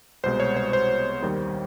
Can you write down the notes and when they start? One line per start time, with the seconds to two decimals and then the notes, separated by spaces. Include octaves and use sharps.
0.24 C2 B2 G#3 C5
0.40 C#5
0.57 C5
0.73 C5
1.22 D#2 D#3 G3